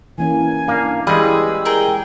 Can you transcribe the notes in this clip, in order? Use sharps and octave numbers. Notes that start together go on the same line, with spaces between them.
E3 A#3 C#4 G#5
A#3 D4 F5
E3 G3 G#3 G4 G#4 B4 E6
G#4 A#4 G5